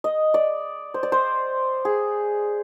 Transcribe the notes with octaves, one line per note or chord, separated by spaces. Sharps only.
D#5
D5
C5
D5
C5
G#4